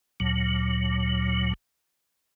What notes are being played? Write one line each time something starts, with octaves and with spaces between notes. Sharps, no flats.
D2 A#2 F#3